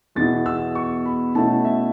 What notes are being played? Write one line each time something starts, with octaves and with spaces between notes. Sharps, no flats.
E2 B2 B3 E4 A6
E6
C#6
B5
B2 A3 C#4 E4 A5
E5